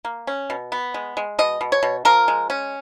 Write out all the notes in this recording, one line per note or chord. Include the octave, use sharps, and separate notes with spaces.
A#3
C#4
B2
B3
G#3
G#3
B2 D#5
B2
C#5
B2
F3 A#4
G#3
C#4